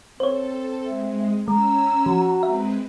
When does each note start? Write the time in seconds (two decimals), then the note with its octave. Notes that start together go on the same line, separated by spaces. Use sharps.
0.20 C4 A4 C5 C#5
0.86 G#3 E5
1.48 G#3 C#4 A#5 E6
2.06 F3 F#4
2.43 G#3 C4 B4 E5